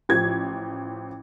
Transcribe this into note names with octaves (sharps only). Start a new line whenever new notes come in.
A1 F3 G#6